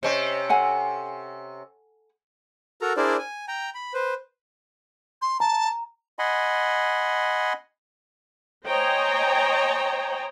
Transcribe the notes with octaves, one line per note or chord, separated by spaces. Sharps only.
C3 C#4 C5 D#5
A4 F#5 G#5
F#4 A4 A#4 A#5
D4 E4 G#4 A#4 C5 D5
G#5
G5 A#5
B5
B4 C5
C6
A5 A#5
D#5 F#5 G#5 B5 C6
C5 C#5 D#5 G5 G#5 A#5